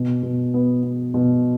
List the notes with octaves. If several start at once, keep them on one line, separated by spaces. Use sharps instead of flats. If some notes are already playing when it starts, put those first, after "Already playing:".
Already playing: B2
B2
B3
B3
B2